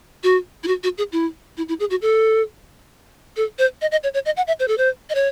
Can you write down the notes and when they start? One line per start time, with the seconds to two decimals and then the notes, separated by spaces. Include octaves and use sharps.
0.23 F#4
0.64 E4
0.68 F#4
0.83 F#4
0.98 G#4
1.12 E4
1.57 E4
1.68 E4
1.80 G#4
1.90 F#4
2.02 A4
3.37 A4
3.59 C5
3.82 D#5
3.92 D#5
4.04 C#5
4.14 C#5
4.26 D#5
4.37 F#5
4.47 E5
4.60 C5
4.68 A4
4.78 C5
5.10 D#5
5.15 C#5